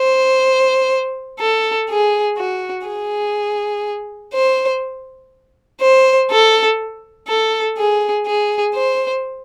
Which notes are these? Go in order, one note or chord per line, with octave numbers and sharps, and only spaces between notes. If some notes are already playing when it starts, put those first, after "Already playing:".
Already playing: C5
A4
G#4
F#4
G#4
C5
C5
A4
A4
G#4
G#4
C5